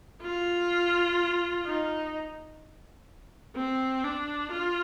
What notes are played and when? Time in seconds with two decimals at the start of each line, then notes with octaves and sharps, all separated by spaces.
0.23 F4
1.66 D#4
3.56 C4
4.04 D4
4.52 F4